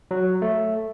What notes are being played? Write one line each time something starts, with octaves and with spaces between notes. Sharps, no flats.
F#3
A3